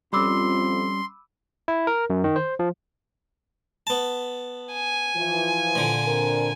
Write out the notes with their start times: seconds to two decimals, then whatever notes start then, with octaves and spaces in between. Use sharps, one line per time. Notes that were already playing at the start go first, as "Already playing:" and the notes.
0.13 F2 G3 C#4 B5 C6 D6 E6
1.68 E4
1.87 A#4
2.10 F#2
2.24 D#3
2.36 C5
2.59 F3
3.87 B3 A5
4.73 G#5
5.16 E3 F3
5.75 A#2 D3
6.06 C4 D4 A#4